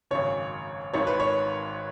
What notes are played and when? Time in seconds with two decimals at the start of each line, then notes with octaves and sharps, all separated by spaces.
0.11 G#1 F#2 C#3 C#5
0.93 G#1 G#2 D#3 C#5
1.07 B4
1.20 C#5